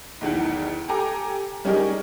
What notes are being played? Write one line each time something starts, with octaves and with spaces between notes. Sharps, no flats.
B1 E2 D#3 F#5
G4 A4 G#5 A#5 D6
G3 C#4 D#4 G4 G#4 A#4